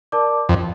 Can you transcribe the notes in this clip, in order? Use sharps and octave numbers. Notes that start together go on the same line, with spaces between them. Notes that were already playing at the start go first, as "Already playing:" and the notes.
A#4 D5 A5 D6
F2